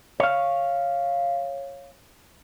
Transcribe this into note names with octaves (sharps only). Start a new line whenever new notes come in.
C#5 F5